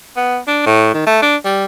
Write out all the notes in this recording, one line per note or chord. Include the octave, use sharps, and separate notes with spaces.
B3
D4
A2
D#3
A3
D4
G3